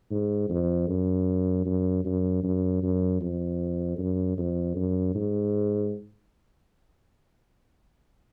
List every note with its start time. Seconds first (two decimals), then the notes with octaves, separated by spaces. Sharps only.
0.11 G#2
0.50 F2
0.88 F#2
1.66 F#2
2.05 F#2
2.44 F#2
2.83 F#2
3.21 F2
3.98 F#2
4.38 F2
4.76 F#2
5.15 G#2